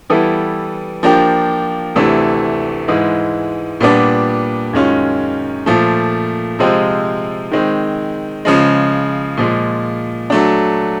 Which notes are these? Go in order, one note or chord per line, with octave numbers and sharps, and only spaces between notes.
E3 G3 B3 E4 A4
F3 A#3 D4 G4
D2 C3 E3 A3 D4
G#2 E3 G#3
A#2 G3 B3 D4
F#2 D#3 G#3 C#4 F4
A#2 F3 A3
C3 F3 G#3 C4 F4
D#3 G#3 C4
C#3 F3 G#3
A#2 F3 G#3
F#3 A3 D4